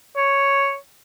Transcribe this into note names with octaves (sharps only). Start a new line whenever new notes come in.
C#5